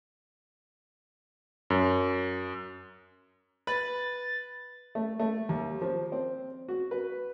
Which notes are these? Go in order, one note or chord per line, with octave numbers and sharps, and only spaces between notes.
F#2
B4 A6
A3
A3
D#2
F3
C4
F#4
B4